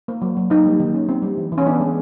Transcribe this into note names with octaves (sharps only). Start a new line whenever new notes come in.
A#3
F#3
F#3
A#3 D#4
G3
D#3
C#4
C4
G3
E3
E3
C#4
B3 D4
G#3